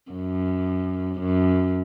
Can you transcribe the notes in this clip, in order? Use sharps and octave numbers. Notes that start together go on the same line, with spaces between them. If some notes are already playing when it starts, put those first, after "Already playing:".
F#2
F#2